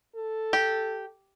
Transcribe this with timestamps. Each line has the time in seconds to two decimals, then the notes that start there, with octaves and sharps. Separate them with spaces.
0.15 A4
0.53 G4